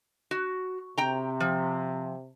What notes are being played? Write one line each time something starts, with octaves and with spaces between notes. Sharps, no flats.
F#4
C3 G5 A#5
F3